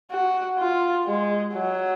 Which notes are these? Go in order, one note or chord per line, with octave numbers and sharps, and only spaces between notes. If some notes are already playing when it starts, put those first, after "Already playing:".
F#4
F4
G#3
F#3